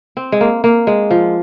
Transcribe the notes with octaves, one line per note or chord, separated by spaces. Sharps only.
C4
G#3
A#3
A#3
G#3
F3